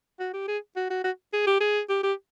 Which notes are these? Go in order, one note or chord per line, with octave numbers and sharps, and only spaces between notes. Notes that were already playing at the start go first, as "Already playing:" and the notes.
F#4
G4
G#4
F#4
F#4
F#4
G#4
G4
G#4
G4
G4